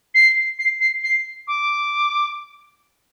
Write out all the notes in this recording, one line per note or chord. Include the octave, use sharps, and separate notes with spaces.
C7
C7
C7
C7
D6